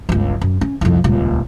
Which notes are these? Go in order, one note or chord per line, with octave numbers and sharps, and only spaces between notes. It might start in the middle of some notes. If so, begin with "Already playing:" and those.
G1 C#2
F#2
C#4
C2 F2
D#1 C#2